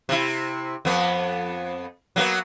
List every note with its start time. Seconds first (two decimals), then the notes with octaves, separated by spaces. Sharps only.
0.09 C3 E4
0.85 F2 B3
2.16 F#3 A#3 B3